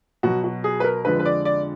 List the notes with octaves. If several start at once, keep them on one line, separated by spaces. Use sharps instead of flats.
B2 F#3 F#4
F#4
G#4
B4
A#4
F2 D3 F3 G#3 B4
B4
D5
D5